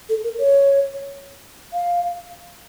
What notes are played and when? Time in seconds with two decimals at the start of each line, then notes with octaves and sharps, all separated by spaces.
0.09 A4
0.24 A#4
0.39 C#5
1.73 F5